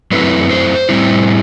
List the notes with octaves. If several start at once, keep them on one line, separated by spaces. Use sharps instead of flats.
F#2 F#3 A3 C4 E4 B4
C5
A2 G3 C4 E4